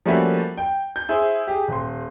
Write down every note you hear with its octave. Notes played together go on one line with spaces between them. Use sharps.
F3 G3 A3 A#3 C#4 F#4
G5
G6
E4 G#4 C5
G4 G#4
D#1 C6